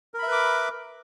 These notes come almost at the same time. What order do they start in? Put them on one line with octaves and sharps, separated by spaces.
A#4 B5 E5 B4 D6